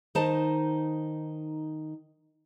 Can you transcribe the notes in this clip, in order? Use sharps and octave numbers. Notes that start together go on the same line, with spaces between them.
D#3 D#4 C5 A5